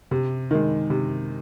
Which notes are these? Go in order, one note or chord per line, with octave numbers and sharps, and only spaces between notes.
C3
D#3 G#3
C3